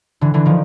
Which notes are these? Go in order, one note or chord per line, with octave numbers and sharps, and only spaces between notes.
D3 E3
D3 E3
D#3 F3